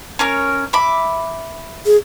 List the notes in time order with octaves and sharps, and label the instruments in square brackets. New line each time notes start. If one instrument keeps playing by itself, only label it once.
[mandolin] C#4 A#4 C#5
E5 B5 D6
[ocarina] G#4